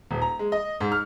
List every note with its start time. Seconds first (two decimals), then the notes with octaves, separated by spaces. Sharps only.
0.11 D#1
0.22 A#5
0.39 G#3
0.52 D#5
0.81 G#2
0.92 F6